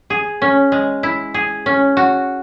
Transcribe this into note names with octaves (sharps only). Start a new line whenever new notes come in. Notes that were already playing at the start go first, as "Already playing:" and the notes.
G#4
C#4
G#3
E4
G#4
C#4
F#4